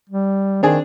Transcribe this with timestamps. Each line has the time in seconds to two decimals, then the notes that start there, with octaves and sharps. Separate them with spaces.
0.09 G3
0.63 D#3 C4 D4 G#4